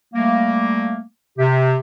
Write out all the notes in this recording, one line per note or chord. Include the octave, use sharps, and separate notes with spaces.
G3 A3 A#3
C3 G4